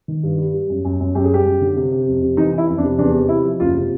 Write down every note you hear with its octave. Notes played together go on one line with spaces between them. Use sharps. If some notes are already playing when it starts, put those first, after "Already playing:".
D#3
G2
G3
G3
F#2
F#2
F#2
F#2 G4
G#4
G3 G4
F#2
D3
C3
C3
F2
C3
E3 D#4
E3 E4
F2
D4
C3
E2 D4
C3
C3 E4
F3
F#1 F4
C3